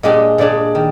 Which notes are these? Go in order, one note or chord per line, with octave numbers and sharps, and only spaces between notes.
A#2 G#3 D4 G4 D#5
A#2 G#3 D4 G#4 D5
D#3